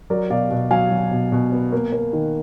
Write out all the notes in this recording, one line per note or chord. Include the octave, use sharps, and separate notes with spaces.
F#3 A#4 D5
B2 D5 F5
B2
F#3 F5 G#5
F#3
B2
B2
B3
A#3
A#3
D#3